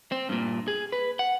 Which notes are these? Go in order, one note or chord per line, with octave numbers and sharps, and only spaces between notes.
C4
G2 A#2
G#4
B4
F#5